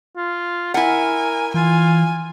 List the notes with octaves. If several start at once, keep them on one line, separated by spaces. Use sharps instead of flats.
F4
E4 A#4 F#5 G#5
E3 F4 G#5